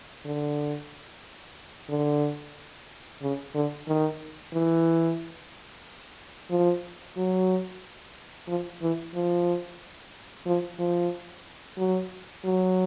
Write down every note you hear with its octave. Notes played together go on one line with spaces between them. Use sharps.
D3
D3
C#3
D3
D#3
E3
F3
F#3
F3
E3
F3
F3
F3
F#3
F#3